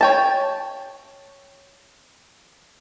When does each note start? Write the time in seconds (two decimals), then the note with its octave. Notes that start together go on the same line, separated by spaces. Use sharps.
0.01 C#5 G5 A5